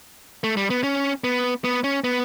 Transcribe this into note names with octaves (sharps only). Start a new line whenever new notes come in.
A3
G3
B3
C#4
B3
B3
C#4
B3